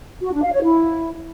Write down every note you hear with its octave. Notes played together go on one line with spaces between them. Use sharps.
F#4
D4
F5
C#5
E4